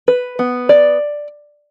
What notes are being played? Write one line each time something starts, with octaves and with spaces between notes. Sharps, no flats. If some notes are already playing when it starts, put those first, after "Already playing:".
B4
B3
D5